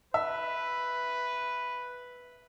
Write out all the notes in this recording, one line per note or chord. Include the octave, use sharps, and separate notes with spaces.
B4 E5